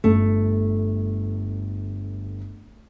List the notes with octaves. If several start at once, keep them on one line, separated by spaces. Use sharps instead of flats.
G1 A3